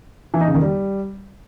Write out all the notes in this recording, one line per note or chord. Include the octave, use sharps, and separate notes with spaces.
E3
D#4
C#3
D#3
G3